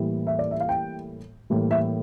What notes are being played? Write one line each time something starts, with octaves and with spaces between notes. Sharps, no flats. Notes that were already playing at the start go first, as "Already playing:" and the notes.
Already playing: A2 E3 G3 A#3
E5
D5
E5
F5
G5
A2 E3 G3 A#3
E5